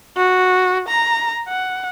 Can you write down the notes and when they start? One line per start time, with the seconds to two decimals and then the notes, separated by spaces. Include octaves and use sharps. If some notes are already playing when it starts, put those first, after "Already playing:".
0.17 F#4
0.88 A#5
1.48 F#5